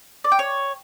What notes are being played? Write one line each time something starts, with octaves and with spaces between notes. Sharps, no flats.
D5
G5
C#5